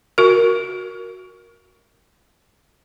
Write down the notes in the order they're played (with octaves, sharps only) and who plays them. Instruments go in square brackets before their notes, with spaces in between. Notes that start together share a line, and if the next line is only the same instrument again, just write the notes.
[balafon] F#4 A#4